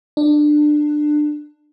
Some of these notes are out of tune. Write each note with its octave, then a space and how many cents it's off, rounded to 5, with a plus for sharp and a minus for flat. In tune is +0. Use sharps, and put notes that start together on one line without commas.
D4 +20